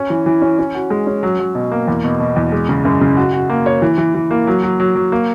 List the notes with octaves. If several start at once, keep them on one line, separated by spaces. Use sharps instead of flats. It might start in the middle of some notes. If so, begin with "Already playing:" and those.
Already playing: C#4
E3
E3
C#4
C#4
F#4
G#3
C#4
F#3
F#3
B2
A#3
E2
B2
B2
E2
G#3
C#3
F#2
C#3
F#4
F#4
A#3
C#5
E3
E3
E3
A#3
F#3
F#3
F#3
F#3
A#3